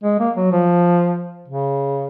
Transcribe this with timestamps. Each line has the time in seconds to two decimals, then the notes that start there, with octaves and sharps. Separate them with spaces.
0.03 G#3
0.19 A#3
0.36 F#3
0.52 F3
1.48 C#3